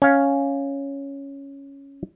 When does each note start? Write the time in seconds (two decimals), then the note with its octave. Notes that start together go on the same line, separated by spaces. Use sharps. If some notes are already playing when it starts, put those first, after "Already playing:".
0.02 C#4 F5